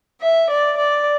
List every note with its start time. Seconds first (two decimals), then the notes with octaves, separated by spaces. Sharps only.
0.20 E5
0.49 D5
0.77 D5